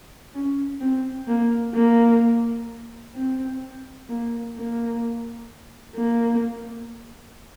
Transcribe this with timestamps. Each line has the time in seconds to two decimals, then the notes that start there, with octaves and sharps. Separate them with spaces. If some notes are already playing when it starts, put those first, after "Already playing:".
0.34 C#4
0.81 C4
1.28 A#3
1.74 A#3
3.15 C4
4.09 A#3
4.56 A#3
5.96 A#3